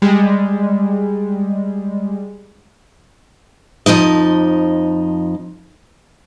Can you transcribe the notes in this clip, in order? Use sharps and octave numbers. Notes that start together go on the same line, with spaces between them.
G3 G#3
F2 F3 D#4 D#5